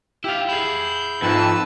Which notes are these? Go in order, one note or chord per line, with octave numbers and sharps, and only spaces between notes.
E4 G4 F5
E4 G#4 G6
F2 G#2 B4 A5 E6